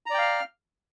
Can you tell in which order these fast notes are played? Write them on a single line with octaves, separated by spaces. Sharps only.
A#5 D5 G5 F5 F6